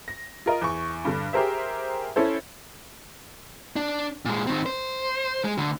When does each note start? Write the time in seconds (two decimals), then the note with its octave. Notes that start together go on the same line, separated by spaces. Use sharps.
0.08 A#6
0.46 F4 A#4 D#5
0.61 E2 C#6
1.05 G2 D3
1.33 G4 G#4 A#4 C5 E5
2.16 C#4 E4 A4 C5
3.76 D4
4.25 A#2 G#3
4.47 D#3 C4
4.66 C5
5.45 G#3
5.58 D2 D3